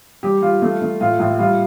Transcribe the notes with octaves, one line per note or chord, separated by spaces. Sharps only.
G3 G4
G3 F4
A3
A3
A2 F4
A2 F4
G3 F4